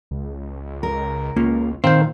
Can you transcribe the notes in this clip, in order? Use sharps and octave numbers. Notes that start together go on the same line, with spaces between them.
C#2
A#4
C#2 A#3 C#4 F4
A#2 D#3 C4 C5 F5